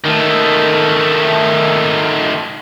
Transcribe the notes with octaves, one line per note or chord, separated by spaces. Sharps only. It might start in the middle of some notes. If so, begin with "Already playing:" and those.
D#3 A3